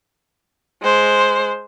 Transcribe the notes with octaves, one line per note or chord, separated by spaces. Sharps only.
G#3 C5